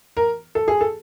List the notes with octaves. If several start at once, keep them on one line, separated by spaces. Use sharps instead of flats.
A#4
A4
G#4
A4